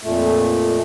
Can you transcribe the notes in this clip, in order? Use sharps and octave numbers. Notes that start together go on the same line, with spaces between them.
F2 A#2 A3